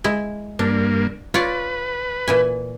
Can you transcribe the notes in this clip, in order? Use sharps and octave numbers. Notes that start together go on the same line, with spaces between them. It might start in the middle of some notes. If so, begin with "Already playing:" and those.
G#3 E4
G2 A#3 D4
F4 B4 C#5 D5
A#2 E3 G#5